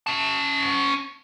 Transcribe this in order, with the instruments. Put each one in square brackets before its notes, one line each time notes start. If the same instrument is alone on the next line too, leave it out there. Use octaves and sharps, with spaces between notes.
[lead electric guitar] C#4 A5